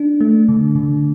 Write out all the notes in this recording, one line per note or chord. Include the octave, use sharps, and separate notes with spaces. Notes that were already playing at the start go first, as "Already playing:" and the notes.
Already playing: D4
A3
D3
D3